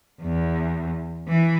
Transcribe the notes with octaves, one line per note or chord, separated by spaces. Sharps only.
E2
E3